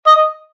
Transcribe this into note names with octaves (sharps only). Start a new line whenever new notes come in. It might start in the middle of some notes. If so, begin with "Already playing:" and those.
D#5